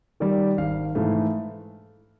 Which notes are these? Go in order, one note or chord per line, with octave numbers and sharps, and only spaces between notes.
D#3 G3 D5
G#1 F5
G#2 E3 A3 F5